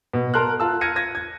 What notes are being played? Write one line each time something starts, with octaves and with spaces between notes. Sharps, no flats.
B2
A#4 A5 C6 F6 F#6
F4 A5 E6
F6 G#6 A#6 C#7 D#7
G#6 A#6 D#7
G#6